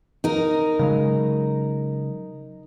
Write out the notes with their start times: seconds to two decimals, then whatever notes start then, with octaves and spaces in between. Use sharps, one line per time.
0.24 D#4 A#4
0.79 C#3 F#3 G#3